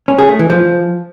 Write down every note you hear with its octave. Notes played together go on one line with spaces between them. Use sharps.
C#4
G#4
A3
E3
F3